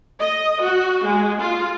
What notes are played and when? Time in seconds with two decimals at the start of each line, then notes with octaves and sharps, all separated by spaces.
0.19 D#5
0.61 F#4
1.04 G#3
1.40 F4